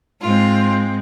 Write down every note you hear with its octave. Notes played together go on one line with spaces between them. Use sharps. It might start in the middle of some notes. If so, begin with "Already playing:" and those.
G#2 G#3 C4 F4